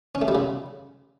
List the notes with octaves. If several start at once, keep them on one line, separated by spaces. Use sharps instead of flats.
C#4
A3
G3
C#3